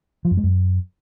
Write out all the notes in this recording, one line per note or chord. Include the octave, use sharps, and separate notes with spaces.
F3
F#2
G#3
F#2